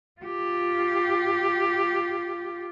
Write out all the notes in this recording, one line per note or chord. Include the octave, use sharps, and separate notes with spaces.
F4 G4